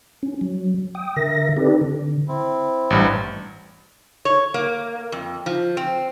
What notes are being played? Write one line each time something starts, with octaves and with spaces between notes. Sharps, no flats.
C#4
F#3
G5 D#6
D3 A#4 E5 A#6
C4 D#4 G4 A4 B4 D5
D3
C4 E4
A1 G2
C#5
A#3
F2
F3
C4